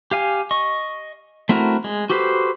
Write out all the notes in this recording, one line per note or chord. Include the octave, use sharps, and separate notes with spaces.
G4 F5 G#5
D#5 C#6
A3 C4 E4 F#4 A#4
G#3
F#4 G4 A4 B4 C5